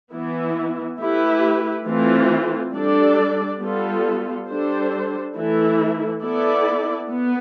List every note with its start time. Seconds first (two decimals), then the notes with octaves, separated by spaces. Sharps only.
0.13 E3 B3 E4
1.00 A3 E4 G4 B4
1.87 E3 A3 C4 F4
2.74 G3 D4 A4 D5
3.61 G3 B3 F4 A4
4.47 G3 D4 A4 C5
5.35 E3 A3 E4 A4
6.22 B3 E4 A4 D5
7.08 B3